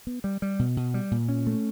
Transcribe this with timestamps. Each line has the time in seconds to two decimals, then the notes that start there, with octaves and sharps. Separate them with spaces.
0.07 B3
0.24 G3
0.42 G3
0.59 B2
0.77 B2
0.94 G3
1.11 A#2
1.29 C#4
1.47 A3